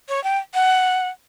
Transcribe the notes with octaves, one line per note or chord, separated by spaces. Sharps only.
C#5
G5
F#5